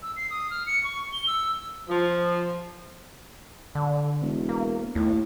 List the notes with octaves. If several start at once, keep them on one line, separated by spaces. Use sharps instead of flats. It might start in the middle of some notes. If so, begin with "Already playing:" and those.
E6
C7
D#6
F6
C#7
C#6
G7
E6
F3
D3
E1
A#3
D#2 A2